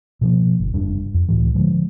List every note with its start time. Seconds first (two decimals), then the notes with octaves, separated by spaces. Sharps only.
0.21 B2 F3 A#3
0.60 G1
0.74 F1 G2 G3 D4
1.14 F2
1.29 C#2 A2 E3
1.55 D3 F3 G#3